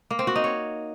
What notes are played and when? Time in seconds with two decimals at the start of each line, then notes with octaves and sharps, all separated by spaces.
0.10 A#3
0.19 C4
0.27 F#4
0.36 D#4
0.44 C#5